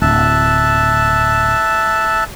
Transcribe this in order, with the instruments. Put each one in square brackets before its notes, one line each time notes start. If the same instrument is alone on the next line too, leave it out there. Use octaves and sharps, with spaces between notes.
[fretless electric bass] D1 [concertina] E5 A5 F#6